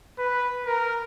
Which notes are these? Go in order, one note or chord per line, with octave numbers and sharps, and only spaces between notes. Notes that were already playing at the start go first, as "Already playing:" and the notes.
B4
A#4